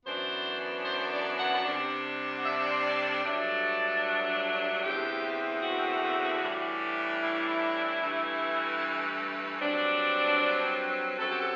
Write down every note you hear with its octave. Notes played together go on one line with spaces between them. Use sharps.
F#2 E3 B3 D4 C5
C5
D5
F#5
C3 G3 D4
F#5
E5
C5
D5
A4
G2 F#3 A3 D4
E2 D3 A3 C4 G4
F#4
A2 E3 G3 D4
E4
G2 E3 A3
G2 F#3 C4 D4
F#2 F#3 C4 A4
G4
A4